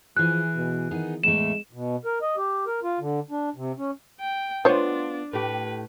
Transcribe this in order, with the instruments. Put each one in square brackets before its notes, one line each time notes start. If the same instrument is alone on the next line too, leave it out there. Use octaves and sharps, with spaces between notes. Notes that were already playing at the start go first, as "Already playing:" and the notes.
[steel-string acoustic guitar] E3 G#4 [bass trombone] F3 [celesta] F#6
[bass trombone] B2
[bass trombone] D#3 [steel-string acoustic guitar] B3 D#4 G#4
[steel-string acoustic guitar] E2 A2 A3 [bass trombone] G#3 [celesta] E7
[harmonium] B2
A#4
D#5
G4
A#4
F4
D3
D4
C3
C#4
[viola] G5
[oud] B3 F4 [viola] D4 [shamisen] C5 C#5
[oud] A2 G4 [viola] B4